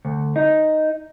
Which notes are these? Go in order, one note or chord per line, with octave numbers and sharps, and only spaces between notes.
D2
D#4